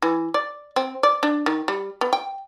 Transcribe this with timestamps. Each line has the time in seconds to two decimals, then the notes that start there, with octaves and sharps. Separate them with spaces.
0.02 E3
0.34 D5
0.76 C4
1.03 D5
1.23 D4
1.46 D#3
1.68 G3
2.01 B3
2.13 G5